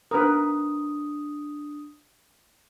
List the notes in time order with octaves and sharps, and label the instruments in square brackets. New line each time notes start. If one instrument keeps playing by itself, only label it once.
[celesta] D4 D#6 [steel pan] A#4 B4